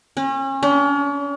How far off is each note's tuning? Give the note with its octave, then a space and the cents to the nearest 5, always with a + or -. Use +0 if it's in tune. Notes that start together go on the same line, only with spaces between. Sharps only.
C#4 -35
C#4 +45